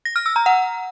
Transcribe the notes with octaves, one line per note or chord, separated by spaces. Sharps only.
A#6
F6
E6
A#5
F#5